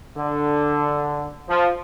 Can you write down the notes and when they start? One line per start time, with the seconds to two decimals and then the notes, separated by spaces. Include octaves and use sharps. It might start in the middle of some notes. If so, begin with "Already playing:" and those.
0.16 D3
1.48 F3